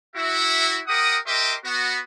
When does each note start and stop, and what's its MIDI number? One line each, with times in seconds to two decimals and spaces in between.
0.16 0.80 64
0.16 0.80 66
0.16 0.80 76
0.88 1.17 67
0.88 1.17 70
0.88 1.17 78
0.88 1.17 87
1.26 1.54 67
1.26 1.54 70
1.26 1.54 75
1.26 1.54 76
1.26 1.54 84
1.26 1.54 86
1.65 1.99 59
1.65 1.99 66